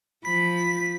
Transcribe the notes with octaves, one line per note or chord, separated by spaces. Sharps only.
F3 B5 B6